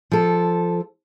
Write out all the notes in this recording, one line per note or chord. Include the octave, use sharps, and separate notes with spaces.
F3 A4